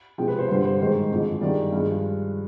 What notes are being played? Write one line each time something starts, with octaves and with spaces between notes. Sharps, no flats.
C3 F3 G#3 G5
B4
C5
G2 D3 G3 C5
C5
G#2 D#3 G#3 C5
F2 D3 F3 G#3
G2 D#3 G#3 D5
G2 F3 G#3